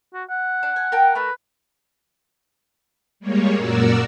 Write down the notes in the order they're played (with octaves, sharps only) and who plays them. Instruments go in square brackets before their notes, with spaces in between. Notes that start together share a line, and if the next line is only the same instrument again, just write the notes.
[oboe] F#4
F#5
[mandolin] D4
G#5
A#4 G5 A5
[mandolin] A3 A#4 [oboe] B4
[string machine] G3 G#3 A#3 C#5
F#2 A#2 F#4 A#4 D5 E6